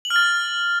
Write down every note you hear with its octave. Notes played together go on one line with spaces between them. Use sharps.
F#7
F6
A6